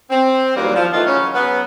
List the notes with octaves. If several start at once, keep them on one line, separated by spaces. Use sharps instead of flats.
C4
E2 D#3 F#3 G3 A#3
F3
D#3 E3 A3 D#4 F4
C#3 F#3 C#4
C#3 F#3 B3